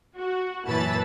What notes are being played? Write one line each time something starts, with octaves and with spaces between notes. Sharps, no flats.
F#4
F#2 A#2 E3 A5 B5 A6